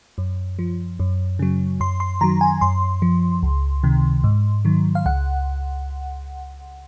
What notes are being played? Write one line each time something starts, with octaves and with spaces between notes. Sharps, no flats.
F#2
F3
F#2
C#3 F#3
F#2 C6
C6
D#3 F#3 A#5
G#5
F#2 C6
F3
C#2
C3 D#3
G#2
D#3 F#3
F5
C#2 F#5